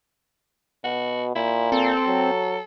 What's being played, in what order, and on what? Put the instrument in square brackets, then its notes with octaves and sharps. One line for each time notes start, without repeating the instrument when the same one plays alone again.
[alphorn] B2 [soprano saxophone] F#4
[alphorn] A#2 [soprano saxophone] E4
[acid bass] C4 [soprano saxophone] A4
[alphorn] F#3